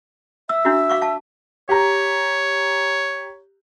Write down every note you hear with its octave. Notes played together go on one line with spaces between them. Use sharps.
E5 E6
D4 E4 F#4
F5 C#6 D6
F5 A5
G4 C#5 A#5